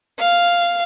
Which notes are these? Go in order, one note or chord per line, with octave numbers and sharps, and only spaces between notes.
F5